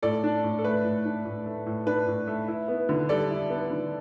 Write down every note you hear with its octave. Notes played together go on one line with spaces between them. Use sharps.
A2 A4 D5
D4
A2
A4
A3 B4
A2
D4
A2
A3
A2
D4 B4
A2
A3
E4
B3
D3
G3 A4 D5
E4
B3
D3